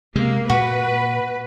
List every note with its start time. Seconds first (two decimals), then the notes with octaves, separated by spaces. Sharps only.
0.16 C3 G#3 A#3
0.50 A#2 F#4 B4